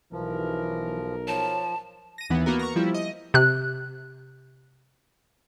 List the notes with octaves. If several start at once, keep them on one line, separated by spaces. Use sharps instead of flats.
B1 E3 F3 A#4
F3 C#5 A5
A#6 D#7
D#2 E3 B3
A#3 B3 F#4 A#4
A#5 C#6
F3 G3 E4
D#5
C3 F#6